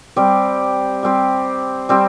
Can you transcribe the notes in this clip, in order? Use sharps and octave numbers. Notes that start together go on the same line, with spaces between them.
G3 C4 G4
G3 C4 G4
G3 C4 G4